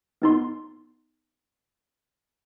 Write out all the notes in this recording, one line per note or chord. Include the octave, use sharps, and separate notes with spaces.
B3 D#4 C6